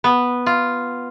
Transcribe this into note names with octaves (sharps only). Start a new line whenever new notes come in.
B3
F4